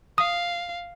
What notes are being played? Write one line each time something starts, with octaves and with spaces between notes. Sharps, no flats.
F5 D#6